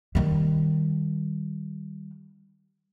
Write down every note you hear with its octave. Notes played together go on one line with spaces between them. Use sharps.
D#3 G3